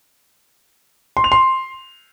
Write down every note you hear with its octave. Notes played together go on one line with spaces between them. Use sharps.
C6
F7
C6